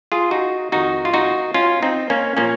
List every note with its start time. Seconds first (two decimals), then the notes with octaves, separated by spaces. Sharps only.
0.12 F4 G#4
0.31 D#4 F#4
0.72 F2 D#3 D#4 F#4
1.05 F4
1.14 D#4 F#4
1.54 C#4 F4
1.82 C4 D#4
2.10 A#3 C#4
2.37 A#2 F3 A#3 C#4